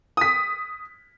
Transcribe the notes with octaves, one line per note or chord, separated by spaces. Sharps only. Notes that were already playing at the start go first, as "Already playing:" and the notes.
D#6 B6